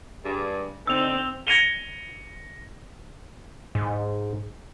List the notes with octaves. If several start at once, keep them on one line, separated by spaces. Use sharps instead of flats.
G2 G#4
D3 C4 D#4 E6 F7
G#6 A#6 C#7 D#7 F7 G7
G#2